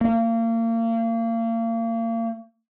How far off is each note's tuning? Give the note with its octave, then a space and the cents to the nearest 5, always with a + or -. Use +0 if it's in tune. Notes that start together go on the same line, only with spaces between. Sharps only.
A#3 -35